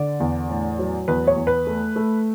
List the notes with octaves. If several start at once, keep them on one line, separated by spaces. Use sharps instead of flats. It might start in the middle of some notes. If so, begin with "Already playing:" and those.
Already playing: D3 D5
E2
A2
F#3
E2 B4
C#5
E2
B4
A3
A3